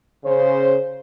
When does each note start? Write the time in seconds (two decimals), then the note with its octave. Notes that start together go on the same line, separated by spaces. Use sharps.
0.24 C#3 C5